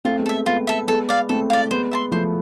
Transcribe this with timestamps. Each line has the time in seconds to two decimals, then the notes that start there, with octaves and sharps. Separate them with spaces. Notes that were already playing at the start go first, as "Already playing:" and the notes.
0.05 A3 C4 F4
0.19 G#3 B3
0.26 A4 E5
0.46 G#3 B3 F4
0.67 A4 E5
0.87 G#3 B3 A4
1.09 D5 F5
1.29 A3 C4 A4
1.50 D5 F5
1.71 G#3 B3 C5
1.91 E5 A5 C6
2.12 F3 A3 C5